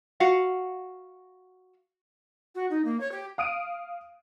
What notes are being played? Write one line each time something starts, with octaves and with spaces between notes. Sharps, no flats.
F#4 F5 F#5
F#4
D#4
A#3
C#5
G4
F5 D#6 D7 D#7